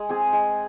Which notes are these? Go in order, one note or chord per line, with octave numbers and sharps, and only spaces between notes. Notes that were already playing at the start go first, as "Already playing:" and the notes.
Already playing: G#3
C4 G#4
G#3